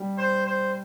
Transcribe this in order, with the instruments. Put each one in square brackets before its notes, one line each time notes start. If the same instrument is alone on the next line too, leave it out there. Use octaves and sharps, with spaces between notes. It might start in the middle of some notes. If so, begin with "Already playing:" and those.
Already playing: [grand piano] G3
[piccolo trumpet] C5
C5